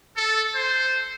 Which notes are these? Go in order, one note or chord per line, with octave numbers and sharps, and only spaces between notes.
A4
C5